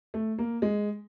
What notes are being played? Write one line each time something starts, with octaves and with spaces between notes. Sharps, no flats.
A3
A#3
G#3